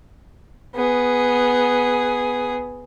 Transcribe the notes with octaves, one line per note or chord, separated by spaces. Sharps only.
B3 G#4